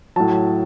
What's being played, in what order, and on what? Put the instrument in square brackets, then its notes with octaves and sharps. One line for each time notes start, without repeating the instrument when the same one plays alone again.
[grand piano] A2 F#3 A5